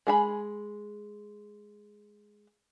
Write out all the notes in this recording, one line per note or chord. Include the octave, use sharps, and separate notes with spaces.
G#3 G#4 B5